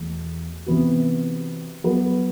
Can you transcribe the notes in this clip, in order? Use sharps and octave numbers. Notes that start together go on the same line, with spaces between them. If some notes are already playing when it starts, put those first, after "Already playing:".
Already playing: E2 B2 A3
C3 E3 B3 F#4
F#3 B3 F#4 B4